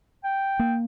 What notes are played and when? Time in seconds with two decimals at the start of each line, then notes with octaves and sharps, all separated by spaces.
0.24 G5
0.59 A#3